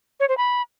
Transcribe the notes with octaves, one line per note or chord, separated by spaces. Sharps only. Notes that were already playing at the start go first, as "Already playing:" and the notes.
C#5
C5
B5